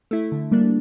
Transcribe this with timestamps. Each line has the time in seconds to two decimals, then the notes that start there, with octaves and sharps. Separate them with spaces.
0.11 A3 E4
0.32 D3
0.51 G3 A#3 D4